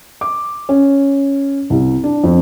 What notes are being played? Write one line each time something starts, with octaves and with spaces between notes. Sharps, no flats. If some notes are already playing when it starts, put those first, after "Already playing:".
D6
C#4
C2
D4
F2